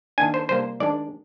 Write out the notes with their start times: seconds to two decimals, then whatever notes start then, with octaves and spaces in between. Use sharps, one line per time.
0.18 D#3 A#3 D4 G#5
0.34 C5
0.49 C3 G3 A#3 C5
0.80 D#3 G#3 D4 D5